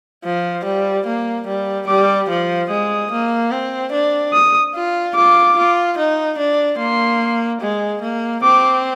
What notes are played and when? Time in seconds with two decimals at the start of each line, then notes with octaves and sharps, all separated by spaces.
0.24 F3
0.65 G3
1.07 A#3
1.47 G3
1.88 G3 D6
2.30 F3
2.70 G#3 D#6
3.11 A#3
3.51 C4
3.92 D4
4.33 D#6
4.75 F4
5.15 F4 D6
5.57 F4
5.98 D#4
6.38 D4
6.79 A#3 C6
7.61 G#3
8.02 A#3
8.43 C4 D6